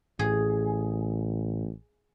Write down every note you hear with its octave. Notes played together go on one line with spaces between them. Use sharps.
A1 A2 G#4